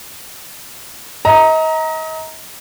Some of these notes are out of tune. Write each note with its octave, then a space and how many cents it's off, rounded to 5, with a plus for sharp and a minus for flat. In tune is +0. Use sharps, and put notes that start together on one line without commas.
D#5 +35 A#5 +0